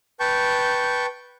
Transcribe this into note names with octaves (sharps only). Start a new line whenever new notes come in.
B4 G5 A5 C#6 G6